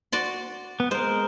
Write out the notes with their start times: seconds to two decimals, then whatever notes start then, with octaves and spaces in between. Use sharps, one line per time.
0.12 F#4 D5 C6
0.80 B3
0.91 G#3 A#4 C5